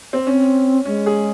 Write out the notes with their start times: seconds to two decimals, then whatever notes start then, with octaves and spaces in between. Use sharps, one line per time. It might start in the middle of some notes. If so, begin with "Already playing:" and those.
0.13 C4
0.27 C4 C#4
0.86 G#3 C#4
1.06 G#4